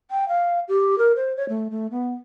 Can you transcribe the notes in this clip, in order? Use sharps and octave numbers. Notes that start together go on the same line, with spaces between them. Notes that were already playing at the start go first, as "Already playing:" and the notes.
G5
F5
G4
A#4
C5
C#5
A3
A3
B3